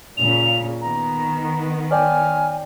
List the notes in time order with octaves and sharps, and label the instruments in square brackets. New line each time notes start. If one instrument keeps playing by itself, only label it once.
[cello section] A#2 C#3 [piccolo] F7
[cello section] D#3 B3 [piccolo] A#5
[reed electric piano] C#5 D5 G5 [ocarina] G#5 [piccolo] F6